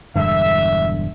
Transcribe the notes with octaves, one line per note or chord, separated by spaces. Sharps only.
E1 G2 D3 E5